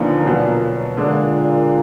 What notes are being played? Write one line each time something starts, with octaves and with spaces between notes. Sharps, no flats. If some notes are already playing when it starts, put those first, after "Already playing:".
Already playing: D#2 A#2 D3 F3 B3 D#4
B2 F#3 B3
A#2 D3 G#3 D4